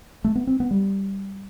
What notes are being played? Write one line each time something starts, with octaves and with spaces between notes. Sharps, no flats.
A3
B3
C4
B3
G3